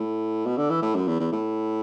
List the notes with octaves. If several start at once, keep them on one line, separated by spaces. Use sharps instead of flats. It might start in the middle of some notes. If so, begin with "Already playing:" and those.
Already playing: A2
B2
D3
E3
A2
F#2
E2
E2
A2